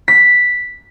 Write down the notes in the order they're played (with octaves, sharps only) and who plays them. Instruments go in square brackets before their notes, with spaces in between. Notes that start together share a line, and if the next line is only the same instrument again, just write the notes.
[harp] B6